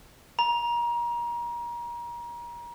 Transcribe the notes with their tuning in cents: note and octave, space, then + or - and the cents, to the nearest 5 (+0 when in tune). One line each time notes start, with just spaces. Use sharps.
A#5 +30